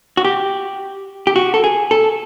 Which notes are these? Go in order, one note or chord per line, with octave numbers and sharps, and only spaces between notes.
F#4
G4
G4
F#4
A4
G#4
A4